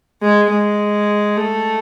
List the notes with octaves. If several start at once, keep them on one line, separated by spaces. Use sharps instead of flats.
G#3
G#3
A3